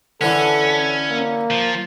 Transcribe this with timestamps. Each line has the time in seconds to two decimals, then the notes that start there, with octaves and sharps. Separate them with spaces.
0.21 D3 E3 C#4 A4
1.10 A#3
1.51 F3